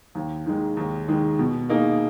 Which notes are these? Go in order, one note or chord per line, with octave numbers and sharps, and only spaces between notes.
D#2
D#3 G#3
D#2
D#3 G#3
B2
A#3 D#4 G#4